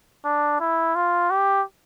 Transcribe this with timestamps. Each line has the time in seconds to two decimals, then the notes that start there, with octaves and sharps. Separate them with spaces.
0.24 D4
0.60 E4
0.95 F4
1.30 G4